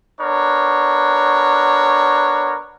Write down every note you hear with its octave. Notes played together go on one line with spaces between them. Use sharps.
B3 D4 A#4 C#5